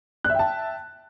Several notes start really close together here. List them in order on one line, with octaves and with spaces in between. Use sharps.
F#6 E5 G5 A5